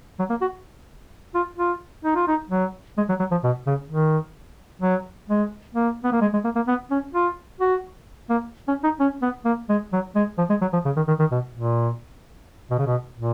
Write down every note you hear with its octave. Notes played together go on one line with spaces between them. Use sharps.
F#3
A#3
F#4
F4
F4
D#4
F4
D#4
F#3
G#3
F#3
F#3
F3
B2
C#3
D#3
F#3
G#3
A#3
B3
A#3
G#3
G#3
A#3
A#3
B3
C#4
F4
F#4
A#3
C#4
D#4
C#4
B3
A#3
G#3
F#3
G#3
F3
G#3
F#3
F3
C#3
D#3
D#3
D#3
B2
A#2
B2
C#3
B2
A#2